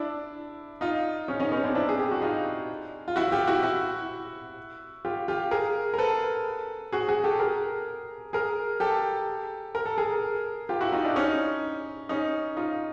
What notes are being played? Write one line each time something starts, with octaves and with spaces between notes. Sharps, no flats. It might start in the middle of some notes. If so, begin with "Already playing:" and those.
Already playing: D4 E4
D#4 F4
C#4 D#4
C#4 D#4
B3 C#4
C4 D4
D4 E4
G#4
G4
F#4
D#4 F4
F4
E4 F#4
F4 G4
E4 F#4
E4 F#4
F4 G4
F4 G4
G#4 A#4
A#4
A4 B4
F#4 G#4
F#4 G#4
G4 A4
G#4 A#4
G#4 A#4
G4 A4
A#4
A4
G#4 A#4
F4 G4
E4 F#4
D#4 F4
D4 E4
C#4 D#4
C#4 D#4
D#4 F4